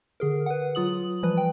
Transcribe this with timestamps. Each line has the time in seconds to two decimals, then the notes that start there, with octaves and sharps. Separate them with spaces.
0.20 D3 G#4 A#4
0.46 B4 F#5
0.75 F#3 F4 D#6 F#7
1.23 E3 F3 G3 B4
1.37 G5